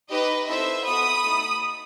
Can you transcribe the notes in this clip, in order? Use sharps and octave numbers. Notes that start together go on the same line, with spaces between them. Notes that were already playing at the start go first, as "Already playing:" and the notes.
D#4 G4 B4 D#5
C4 E4 A4 C5 E5
B3 F#4 A4 B5 D#6
A3 D#4 A4